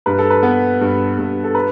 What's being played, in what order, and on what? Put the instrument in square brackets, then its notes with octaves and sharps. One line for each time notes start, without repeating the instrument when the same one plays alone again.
[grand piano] G2 B4
A4
B4
B3
G2
G2
A4
B4